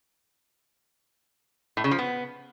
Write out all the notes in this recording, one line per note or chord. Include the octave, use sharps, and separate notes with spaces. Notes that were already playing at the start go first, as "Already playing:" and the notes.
A2
C#3
F3
B3